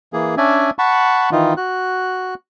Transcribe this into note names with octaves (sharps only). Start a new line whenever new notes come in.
E3 A#3 G#4
C#4 D4 D5 E5 G#5
F#5 A5 B5 C#6
D#3 E3 D#4 F4
F#4 F#6